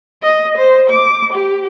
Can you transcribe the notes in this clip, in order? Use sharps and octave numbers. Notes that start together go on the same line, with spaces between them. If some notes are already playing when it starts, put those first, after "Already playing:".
D#5
C5
D6
G4